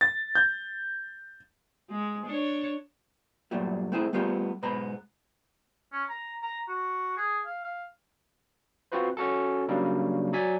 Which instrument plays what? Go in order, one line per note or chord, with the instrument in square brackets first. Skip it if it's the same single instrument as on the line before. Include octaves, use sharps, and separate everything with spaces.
[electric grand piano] A6
G6
[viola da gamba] G#3
D4 C#5
[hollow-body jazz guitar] G2 A#2 F#3 G3 A3
A3 C4 E4 G#4
G3 A3 B3 F4 G4
G#2 B2 B3 A#5 B5
[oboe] C#4
A#5
A#5
F#4
G#4
F5
F5
[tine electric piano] C4 F4 F#4 B4 C5
C#4 F#4 A4
C#3 F#3 G3 A#3 D4
F#3 D5 G#5 B6